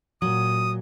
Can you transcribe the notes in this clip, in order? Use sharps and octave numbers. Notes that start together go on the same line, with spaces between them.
A#2 F#3 D#6